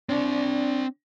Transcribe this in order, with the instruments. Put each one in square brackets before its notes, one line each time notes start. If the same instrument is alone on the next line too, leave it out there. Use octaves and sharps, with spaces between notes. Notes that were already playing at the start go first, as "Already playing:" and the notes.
[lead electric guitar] C4 D5 [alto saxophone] D4